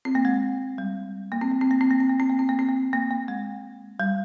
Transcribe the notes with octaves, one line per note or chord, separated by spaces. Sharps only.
C4
A#3
G#3
G3
A#3
C4
A#3
C4
A#3
C4
A#3
C4
A#3
C4
A#3
C4
A#3
C4
A#3
A#3
A#3
G#3
G3